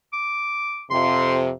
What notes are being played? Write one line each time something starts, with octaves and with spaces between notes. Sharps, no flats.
D6
F2 C3 C6